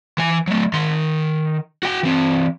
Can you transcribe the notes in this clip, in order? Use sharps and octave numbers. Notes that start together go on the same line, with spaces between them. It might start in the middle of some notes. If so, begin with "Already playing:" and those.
E3 G#5
F#3 A3
D#3 C6
F#4 G5
E3 C4